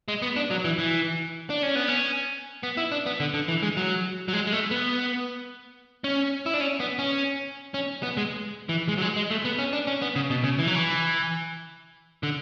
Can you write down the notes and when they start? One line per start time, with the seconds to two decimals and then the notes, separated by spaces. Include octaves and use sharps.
0.08 G#3
0.22 B3
0.36 D4
0.51 F#3
0.65 E3
0.79 E3
1.50 D4
1.63 C#4
1.76 B3
1.88 C#4
2.63 B3
2.77 E4
2.92 D4
3.06 B3
3.20 D3
3.34 D3
3.48 E3
3.63 G#3
3.77 F#3
4.28 F#3
4.33 G#3
4.47 G#3
4.53 A3
4.71 B3
6.04 C#4
6.46 E4
6.54 D4
6.61 C#4
6.80 B3
6.99 C#4
7.74 C#4
8.03 B3
8.17 G#3
8.69 E3
8.88 G#3
8.98 F#3
9.02 G#3
9.16 G#3
9.30 A3
9.45 B3
9.59 C#4
9.73 D4
9.87 C#4
10.02 B3
10.16 C#3
10.30 B2
10.44 C#3
10.59 E3
10.67 F#3
10.75 E3
12.23 D3